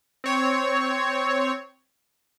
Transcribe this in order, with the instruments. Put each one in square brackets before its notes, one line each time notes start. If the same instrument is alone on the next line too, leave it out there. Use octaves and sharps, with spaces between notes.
[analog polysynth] C4 C#5